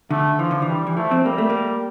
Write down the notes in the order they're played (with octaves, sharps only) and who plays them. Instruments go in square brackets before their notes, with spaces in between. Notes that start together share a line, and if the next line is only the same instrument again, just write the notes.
[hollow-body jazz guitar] D3 [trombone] A3
[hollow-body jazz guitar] E3 [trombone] F3
[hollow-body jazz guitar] D3
E3
[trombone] G3
[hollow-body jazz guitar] E3
[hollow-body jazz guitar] F3 [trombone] A3
[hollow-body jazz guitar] C4
[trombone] G3 [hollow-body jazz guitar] A#3
[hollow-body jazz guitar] A3
A#3